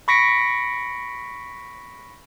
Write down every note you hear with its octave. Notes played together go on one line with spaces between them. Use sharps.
B5 C#6 A#6 B6 C#7 D7